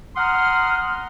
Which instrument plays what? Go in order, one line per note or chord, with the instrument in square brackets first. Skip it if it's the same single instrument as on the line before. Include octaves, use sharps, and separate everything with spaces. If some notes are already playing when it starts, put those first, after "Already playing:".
[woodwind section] F#5 A#5 C6 D#6 F6